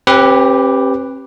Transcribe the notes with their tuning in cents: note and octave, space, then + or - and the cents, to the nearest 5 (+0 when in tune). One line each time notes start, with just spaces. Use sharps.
C4 +45 G4 +0 B4 +0